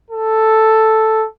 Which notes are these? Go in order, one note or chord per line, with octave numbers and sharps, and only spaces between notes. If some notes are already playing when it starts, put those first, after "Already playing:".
A4